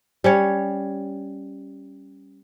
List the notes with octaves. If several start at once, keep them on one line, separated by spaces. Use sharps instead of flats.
G3 C#4 C#5